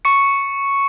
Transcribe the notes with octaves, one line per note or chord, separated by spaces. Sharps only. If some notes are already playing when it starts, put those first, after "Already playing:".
C#6 C#7